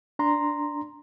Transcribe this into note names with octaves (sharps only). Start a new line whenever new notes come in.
D4 A#5 C6